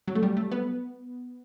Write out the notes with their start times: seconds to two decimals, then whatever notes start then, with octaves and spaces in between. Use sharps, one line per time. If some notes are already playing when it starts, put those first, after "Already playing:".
0.07 F#3
0.15 A3
0.23 G3
0.37 A3
0.51 B3